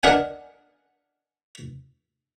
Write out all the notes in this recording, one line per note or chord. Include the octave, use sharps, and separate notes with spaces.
D4 A#4 D#5 F#5 G#5